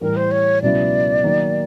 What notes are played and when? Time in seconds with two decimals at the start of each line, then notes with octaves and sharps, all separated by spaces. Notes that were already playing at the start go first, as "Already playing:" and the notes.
0.01 A2 E3 G3 A#4
0.16 C5
0.31 C#5
0.62 C#2 B2 F#3 B3 E4 D5
1.24 D#3 F#3 A#3